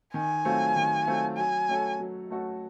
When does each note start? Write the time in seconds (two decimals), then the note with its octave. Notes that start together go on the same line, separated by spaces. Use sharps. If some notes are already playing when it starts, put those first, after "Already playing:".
0.14 D#3 G#5
0.45 F#3 A3 C4 F4
0.76 D#3
1.07 F#3 A3 C4 F4
1.37 F#3 G#5
1.68 A3 C#4 F#4 A4
2.00 F#3
2.30 A3 C#4 F#4 A4